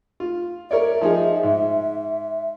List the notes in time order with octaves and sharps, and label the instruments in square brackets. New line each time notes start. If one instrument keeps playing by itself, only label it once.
[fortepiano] F4
[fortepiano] A#4 C#5 D5 [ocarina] E5
[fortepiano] F3 D#4 G#4
G#2